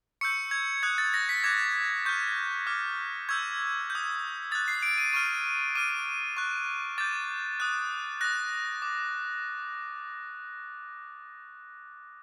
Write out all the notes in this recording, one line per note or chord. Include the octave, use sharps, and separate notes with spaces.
C#6 E6 G6 C#7
G#6
D#6 F#6 G#6
A6
A#6
B6
D6 F#6 G#6
C#6 F6 G6
D6 F6
C#6 E6 G6 G#6
G6
D#6
D#6 F#6 A6
C7
D7
D#7
C#6 F6 D#7
D6 F6 D#7
C#6 F#6
D6 G6 A6
D#6 F#6
D#6 F#6 A#6
D6